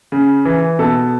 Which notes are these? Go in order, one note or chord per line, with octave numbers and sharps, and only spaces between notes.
C#3
E3
B2 A4